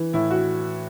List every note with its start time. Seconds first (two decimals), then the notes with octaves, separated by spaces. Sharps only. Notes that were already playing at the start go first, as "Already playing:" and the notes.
Already playing: E3
0.13 A2 E4
0.31 F#4